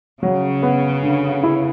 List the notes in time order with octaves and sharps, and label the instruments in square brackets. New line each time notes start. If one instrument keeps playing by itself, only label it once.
[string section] C#3 [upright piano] F#3
[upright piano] B3
D3
E4